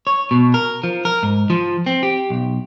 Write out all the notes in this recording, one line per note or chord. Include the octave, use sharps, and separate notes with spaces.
C#5
B2
A#4
F3
A#4
G#2
F3
C4
G4
B1